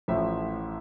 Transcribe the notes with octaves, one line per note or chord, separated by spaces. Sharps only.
A1 A2 F3 E5